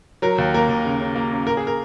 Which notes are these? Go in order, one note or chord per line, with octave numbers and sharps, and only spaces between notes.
F#3 A#4
D#2
A#3 A#4
D#2
C#3
C#3
A#3
C#3
A#3 A#4
G#4
A#4